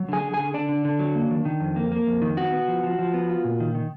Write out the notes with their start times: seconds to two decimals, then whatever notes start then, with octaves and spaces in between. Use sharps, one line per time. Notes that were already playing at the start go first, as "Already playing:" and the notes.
Already playing: F#3
0.09 D3 G#4 G#5
0.24 D3
0.34 G#4 G#5
0.39 D3
0.54 D3 D4 D5
0.69 D3
0.85 D3
0.99 F#3
1.15 A#3
1.31 D#3
1.45 D#3
1.60 F2
1.76 A#3
1.92 A#3
2.07 F2
2.22 D#3
2.37 B3 F#4
2.52 B3
2.68 F3
2.83 F3
2.99 F3
3.14 B3
3.29 F4
3.44 A#2
3.60 D#3
3.75 D#3